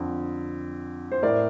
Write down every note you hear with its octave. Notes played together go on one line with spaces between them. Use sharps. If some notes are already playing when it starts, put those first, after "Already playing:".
Already playing: F2 D3
C5
A2 A#4 D5